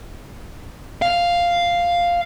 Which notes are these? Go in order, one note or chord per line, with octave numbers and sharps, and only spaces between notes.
F5